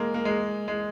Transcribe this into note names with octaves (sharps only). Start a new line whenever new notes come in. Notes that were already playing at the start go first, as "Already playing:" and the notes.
Already playing: G#3 A#3
A#3
G#3
G#3